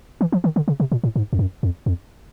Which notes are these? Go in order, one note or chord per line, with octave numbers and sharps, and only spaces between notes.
E3
F3
D#3
D3
C#3
C3
A#2
A2
G#2
F2
F#2
F2
F2